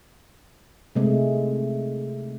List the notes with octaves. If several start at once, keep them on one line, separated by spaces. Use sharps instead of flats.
C3 G#3 A3